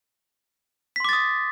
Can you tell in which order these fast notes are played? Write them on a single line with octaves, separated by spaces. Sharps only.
B6 C6 D6 A6 D#6